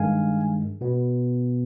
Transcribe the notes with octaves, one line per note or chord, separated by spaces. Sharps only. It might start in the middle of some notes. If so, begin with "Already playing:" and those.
Already playing: G2 D#3 G#3 F5 G#5
B2 B3